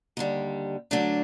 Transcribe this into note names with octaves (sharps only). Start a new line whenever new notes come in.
D#2 D3 G3
D3 F#3 A3 D4